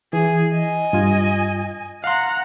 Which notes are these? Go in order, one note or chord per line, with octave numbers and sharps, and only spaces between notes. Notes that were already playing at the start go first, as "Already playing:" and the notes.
E3 G#4
D#5 G#5
G2 F4
F5 F#5 A#5 C6